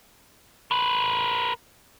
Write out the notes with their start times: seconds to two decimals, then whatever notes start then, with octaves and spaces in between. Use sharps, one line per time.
0.71 A#4 B4